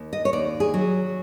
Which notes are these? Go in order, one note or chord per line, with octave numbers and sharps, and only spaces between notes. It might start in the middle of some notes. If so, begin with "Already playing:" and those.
Already playing: D#2
D#5
C#5
D#2 D5
G#4
F#3